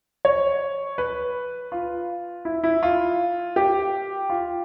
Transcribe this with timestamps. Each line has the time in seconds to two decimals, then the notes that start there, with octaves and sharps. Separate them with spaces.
0.25 C#5
0.98 B4
1.72 F4
2.45 E4
2.64 E4
2.83 F4
3.56 G4
4.30 F4